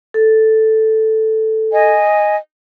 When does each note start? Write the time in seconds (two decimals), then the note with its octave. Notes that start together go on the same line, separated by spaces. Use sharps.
0.14 A4
1.72 D#5 G#5